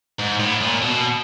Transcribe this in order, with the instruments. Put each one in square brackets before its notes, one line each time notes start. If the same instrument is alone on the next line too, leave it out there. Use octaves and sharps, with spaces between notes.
[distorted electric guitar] G#2
A2
A#2
B2